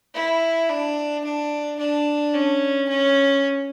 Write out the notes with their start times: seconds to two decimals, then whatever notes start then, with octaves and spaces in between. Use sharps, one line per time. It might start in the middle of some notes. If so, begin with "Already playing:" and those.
0.15 E4
0.69 D4
1.24 D4
1.79 D4
2.34 C#4
2.88 C#4